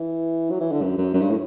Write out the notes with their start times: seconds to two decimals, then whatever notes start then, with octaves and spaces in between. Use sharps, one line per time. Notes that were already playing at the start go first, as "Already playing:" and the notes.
Already playing: E3
0.50 F#3
0.60 E3
0.71 D3
0.82 F#2
0.98 F#2
1.14 F#2
1.21 G2
1.30 A2